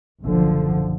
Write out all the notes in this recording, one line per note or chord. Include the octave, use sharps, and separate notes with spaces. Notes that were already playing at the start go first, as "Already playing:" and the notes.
F#1 B1 D3 F3